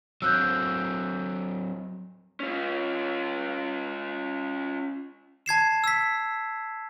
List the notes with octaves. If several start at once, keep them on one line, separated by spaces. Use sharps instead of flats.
F#3 C4 E6 F#6 G6
C#4 F4
A5 G#6 C7 E7
E6 B6